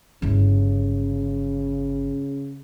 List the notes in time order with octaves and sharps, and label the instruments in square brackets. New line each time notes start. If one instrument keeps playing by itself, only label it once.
[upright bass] G1 E4 [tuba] C#3